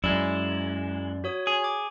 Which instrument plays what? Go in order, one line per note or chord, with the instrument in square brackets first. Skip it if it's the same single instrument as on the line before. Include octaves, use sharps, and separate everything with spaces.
[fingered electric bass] F#2 [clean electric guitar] G#3 E4 [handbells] D5
[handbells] F#4 C#5 D#6
[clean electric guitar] G#4
[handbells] D6